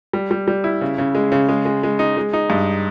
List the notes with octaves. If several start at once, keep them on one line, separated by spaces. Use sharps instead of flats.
G3
G3
G3
E4
C#3
C#3
G#3
C#3
G#3
G#3
G#3
D#4
G#3
D#4
G2